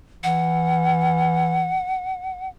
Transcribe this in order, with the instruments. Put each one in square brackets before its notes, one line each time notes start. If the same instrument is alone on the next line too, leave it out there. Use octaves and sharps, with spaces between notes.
[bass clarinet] E3 [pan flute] F#5